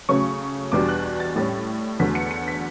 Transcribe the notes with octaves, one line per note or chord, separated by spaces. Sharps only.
C#3 F#3 A3 C#4 C#6
E2 B2 G3 D4 D6
F#6
A6
A2 G3 C#4
E2 D3 F#3 A3 B6
C#7
C#7
B6